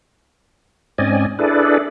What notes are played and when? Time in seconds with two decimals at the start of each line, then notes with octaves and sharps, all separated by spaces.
0.98 G#2 C4 C#4 D5 D#5 G#5
1.39 D4 E4 G#4 A4 B4 D5